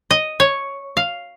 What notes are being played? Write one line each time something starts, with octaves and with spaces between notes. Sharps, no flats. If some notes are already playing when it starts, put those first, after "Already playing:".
D#5
C#5
F5